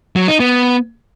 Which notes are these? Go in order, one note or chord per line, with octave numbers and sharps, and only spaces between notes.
F#3
D#4
B3